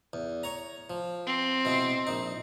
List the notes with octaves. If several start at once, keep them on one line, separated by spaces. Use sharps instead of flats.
E2
C#5 A#5
F3
C4
B2 E3 G#3
A#1 D#4